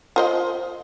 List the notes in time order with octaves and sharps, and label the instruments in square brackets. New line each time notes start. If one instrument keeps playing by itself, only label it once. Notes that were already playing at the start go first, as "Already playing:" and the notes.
[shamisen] F4 C5 D#5